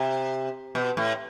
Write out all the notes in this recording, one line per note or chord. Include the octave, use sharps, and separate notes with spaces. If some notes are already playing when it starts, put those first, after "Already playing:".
Already playing: C3
B2
A2